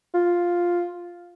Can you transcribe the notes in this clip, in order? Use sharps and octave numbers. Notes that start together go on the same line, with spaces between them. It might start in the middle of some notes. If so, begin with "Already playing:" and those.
F4